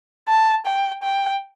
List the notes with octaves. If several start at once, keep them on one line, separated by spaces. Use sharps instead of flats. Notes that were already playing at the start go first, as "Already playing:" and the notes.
A5
G5
G5